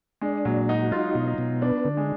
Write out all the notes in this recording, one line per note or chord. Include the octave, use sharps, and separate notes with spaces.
G#3 D4
A#2 F#3
D#4 F#4
D#4 F4
B2
D#4
B2
B3 D4
D3
G#3